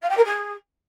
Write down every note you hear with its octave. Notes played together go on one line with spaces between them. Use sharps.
F5
G5
A#4
G#4